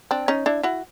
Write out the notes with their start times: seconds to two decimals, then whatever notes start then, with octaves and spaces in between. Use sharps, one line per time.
0.11 C4 D4
0.28 C#4 D#4
0.46 D4 E4
0.63 E4 F#4